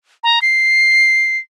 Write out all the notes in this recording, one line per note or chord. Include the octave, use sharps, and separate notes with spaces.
A#5
C7